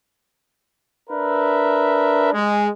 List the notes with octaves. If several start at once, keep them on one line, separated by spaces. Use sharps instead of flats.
D4 A#4 B4 E5
G#3